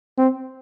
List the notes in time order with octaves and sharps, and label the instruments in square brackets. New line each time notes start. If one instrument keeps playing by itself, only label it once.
[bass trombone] C4